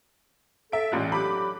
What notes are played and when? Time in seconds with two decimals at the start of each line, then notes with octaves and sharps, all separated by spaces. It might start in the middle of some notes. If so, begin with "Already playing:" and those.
0.72 A4 E5 D7
0.92 A1 G2 A#2 G#3 F4 F#6
1.12 D3 F#3 G4 B5 D6